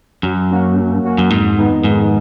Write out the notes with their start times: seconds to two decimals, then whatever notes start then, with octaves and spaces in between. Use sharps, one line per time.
0.23 F#2 F#3
0.50 A#3 C#4 F#4
0.77 F#3
1.04 A#3 C#4 F#4
1.18 F#2
1.30 F2 G#2
1.57 D#3 G#3 B3 D#4
1.84 F2 G#2